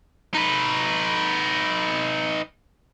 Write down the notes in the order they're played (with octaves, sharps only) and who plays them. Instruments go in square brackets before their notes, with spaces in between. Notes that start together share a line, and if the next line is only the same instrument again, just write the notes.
[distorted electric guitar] D#4 B4